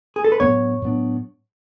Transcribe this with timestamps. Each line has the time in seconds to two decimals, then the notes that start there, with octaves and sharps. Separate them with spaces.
0.16 G#4
0.24 A4
0.32 B4
0.40 A2 F#3 B3 D4 C#5
0.82 A2 F#3 B3 D4